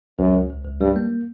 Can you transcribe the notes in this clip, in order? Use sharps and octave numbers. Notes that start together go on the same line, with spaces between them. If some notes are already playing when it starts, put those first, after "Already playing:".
C#2 F#2
C#2
C#2
C#2
G2 G3
A#3